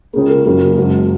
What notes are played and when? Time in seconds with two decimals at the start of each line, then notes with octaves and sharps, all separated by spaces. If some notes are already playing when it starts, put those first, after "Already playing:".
0.13 C#2 C#3 A#3 G#4
0.30 A#4
0.45 F#1 F#2 C#3 A#3 F#4
0.77 F#1 F#2 F#3 G#3